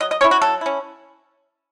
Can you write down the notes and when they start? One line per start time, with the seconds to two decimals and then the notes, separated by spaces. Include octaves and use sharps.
0.01 F#3 D#5
0.11 D#5
0.21 C#4 E4 C#5
0.31 F#4
0.41 F#3 A4
0.61 C#4 E4